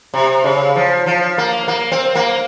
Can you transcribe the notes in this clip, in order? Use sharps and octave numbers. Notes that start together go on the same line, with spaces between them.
C3
C#3
F3
F3
A#3
A#3
C4
A#3